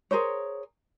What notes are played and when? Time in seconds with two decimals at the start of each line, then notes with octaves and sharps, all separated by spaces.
0.11 G#4 A#4 C5 C#5